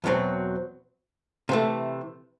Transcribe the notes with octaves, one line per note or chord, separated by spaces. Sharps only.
E2 B2 F#3 C4
C3 E3 A3